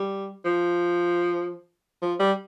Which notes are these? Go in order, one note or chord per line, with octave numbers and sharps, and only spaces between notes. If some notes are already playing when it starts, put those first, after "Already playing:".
Already playing: G3
F3
F3
G3